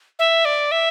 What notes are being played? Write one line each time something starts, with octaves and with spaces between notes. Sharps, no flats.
E5
D5
E5